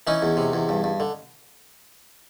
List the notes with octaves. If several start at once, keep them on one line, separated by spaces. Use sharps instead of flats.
E3 C#4 D#4
E2
C3
E2
G2
G2
D3